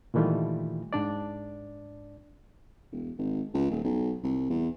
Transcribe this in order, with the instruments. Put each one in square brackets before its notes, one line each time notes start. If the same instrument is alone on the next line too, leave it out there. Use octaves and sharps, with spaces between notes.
[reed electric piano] A#2 D#3 E3 G3 A3 F4
G#2 D4 D5
[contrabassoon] E1
G#1
C#2
D#1
B1
C2
E2